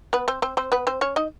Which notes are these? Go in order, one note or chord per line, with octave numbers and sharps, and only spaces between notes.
B3 B4
C4 C5
C4 C5
C4 C5
B3 B4
C4 C5
C#4 C#5
D#4 D#5